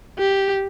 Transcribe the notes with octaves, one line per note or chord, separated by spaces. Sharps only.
G4